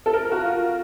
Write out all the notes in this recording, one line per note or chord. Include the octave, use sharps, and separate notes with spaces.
A4
A#4
F#4
F4